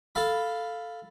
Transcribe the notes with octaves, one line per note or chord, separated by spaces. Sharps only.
A4 F5 B5